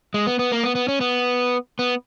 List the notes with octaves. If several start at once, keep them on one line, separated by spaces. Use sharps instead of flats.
G#3
B3
B3
A#3
B3
B3
C#4
B3
B3